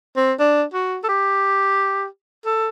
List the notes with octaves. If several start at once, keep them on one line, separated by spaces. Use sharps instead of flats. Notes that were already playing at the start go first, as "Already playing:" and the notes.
C4
D4
F#4
A4
G4
A4